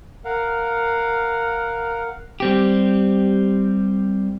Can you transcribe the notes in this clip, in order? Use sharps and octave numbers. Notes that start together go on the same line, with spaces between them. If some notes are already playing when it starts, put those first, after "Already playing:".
A#4 F5 F#5
G3 C4 G4